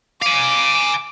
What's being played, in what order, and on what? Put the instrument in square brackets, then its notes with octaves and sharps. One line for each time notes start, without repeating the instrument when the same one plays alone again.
[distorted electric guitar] F5 G#5 [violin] D6